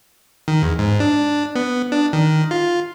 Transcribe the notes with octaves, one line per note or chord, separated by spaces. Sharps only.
D#3
E2
G#2
D4
B3
D4
D#3
F4